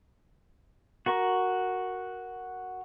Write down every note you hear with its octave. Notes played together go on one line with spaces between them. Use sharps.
F#4 A#4 C#6